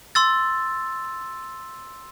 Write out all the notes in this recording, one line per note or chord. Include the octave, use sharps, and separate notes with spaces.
C6 E6 A6